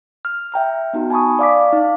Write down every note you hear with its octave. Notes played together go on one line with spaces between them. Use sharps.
F6
E5 G5 A#5 F6
B3 D#4 F#4
G#5 A5 B5 C#6 D#6
D5 F5 D6 B6
D#4 F5